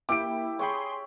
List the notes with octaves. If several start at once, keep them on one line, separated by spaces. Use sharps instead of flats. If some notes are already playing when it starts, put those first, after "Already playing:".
A#3 E4 G4 E5 G5 D6 D7
G#4 C#5 G5 B5 C6